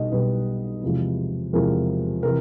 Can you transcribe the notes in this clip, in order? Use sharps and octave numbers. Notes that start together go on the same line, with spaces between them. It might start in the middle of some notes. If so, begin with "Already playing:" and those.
Already playing: B1 B2 G3 D#5
B1 B2 G3 B4
E2 C3 F3 G#3
E2 C3 F3 G#3 A#4
C3 E3 A#4